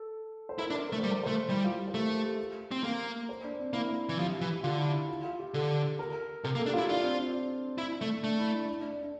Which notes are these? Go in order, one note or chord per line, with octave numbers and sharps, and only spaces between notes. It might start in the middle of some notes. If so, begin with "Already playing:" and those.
Already playing: A4
C5
E4 A#4
D4
C5
A3 A#4
G3 C5
A#4
A3 C5
A#4
G3 E4
F4
G4
C5
A3 A#4
G4
A4
C4
A#3 A#4
C5
D4
C4
A#3 E4
E3
F3 G4
E3
G4
D3 F4
E4
F4
F4
G4
D3 A4
A#4
C3 A#4
A#3
A4
D4 G4
E4 F4
D4 F4
C4
C4
D4
E4
A3
A3 D4
E4
D4
D4
D4
D4
D4